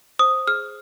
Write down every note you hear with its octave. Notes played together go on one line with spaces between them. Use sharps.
C5 D#6
G#4 F6